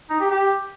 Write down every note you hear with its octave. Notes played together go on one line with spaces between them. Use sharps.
D#4
G4
G4